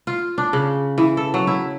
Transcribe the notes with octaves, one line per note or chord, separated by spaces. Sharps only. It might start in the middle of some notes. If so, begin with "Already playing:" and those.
F4
D4
C#3
E3
A4
F#3
E4